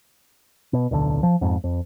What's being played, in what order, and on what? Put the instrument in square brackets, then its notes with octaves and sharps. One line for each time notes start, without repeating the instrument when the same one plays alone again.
[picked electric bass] B2
D1 B1 B2 D3
F3
F2 G#2
F2